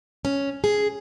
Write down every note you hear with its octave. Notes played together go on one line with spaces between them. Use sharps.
C#4
G#4